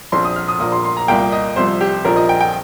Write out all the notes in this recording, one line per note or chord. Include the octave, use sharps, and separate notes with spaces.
A#1 A#2 F3 C4 C6
D#6
F6
D#6
A#1 A#2 F3 A#3 D#6
C6
C6
A#5
C2 A#2 A#3 G5
D#5
C2 C3 F3 C5
G4
A#1 A#2 F3 C4 A#4
D#5
G5
G5